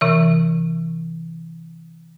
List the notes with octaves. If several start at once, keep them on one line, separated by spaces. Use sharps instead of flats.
C3 E3 E5